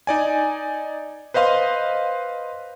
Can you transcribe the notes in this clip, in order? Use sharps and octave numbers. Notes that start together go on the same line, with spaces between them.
D#4 D5 G#5
B4 C5 D#5 F5 C6